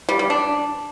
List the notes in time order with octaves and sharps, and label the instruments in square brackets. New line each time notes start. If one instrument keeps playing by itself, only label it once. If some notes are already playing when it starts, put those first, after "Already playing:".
[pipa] G3
G3
D4